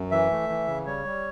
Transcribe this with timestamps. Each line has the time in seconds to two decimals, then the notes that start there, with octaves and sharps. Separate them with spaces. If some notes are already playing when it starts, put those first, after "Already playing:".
Already playing: F#2
0.11 E3 E5
0.31 A3
0.49 E3
0.68 C#3
0.86 G3 C#5
1.05 G3